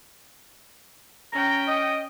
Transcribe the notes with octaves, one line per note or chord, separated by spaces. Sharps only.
C#4 G5 A#5
D#5